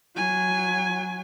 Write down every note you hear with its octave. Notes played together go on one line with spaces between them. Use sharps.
F#3 G#5